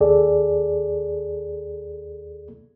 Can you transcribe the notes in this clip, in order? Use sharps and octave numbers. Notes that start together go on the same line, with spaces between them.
D#2 G#4 A4 D5